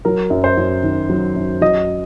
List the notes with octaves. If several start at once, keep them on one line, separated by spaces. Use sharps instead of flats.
F#3 A#4
F#2
C5
F#2
D#3
F#3
F#2
F#3 D#5